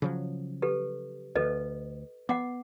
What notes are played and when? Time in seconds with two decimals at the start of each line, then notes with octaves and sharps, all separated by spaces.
0.02 C#3 F3 F#3
0.62 G4 A4 B4
1.36 D2 A4 B4 D#5
2.29 B3 F#5 D6